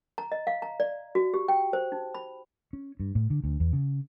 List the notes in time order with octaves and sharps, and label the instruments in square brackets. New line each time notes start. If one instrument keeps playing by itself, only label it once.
[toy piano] A#5
D#5
F5
A#5
D5
F#4
G4
G5
C5
D#4
B5
[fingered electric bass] C#4
G2
A2
D3
D2
E2
C#3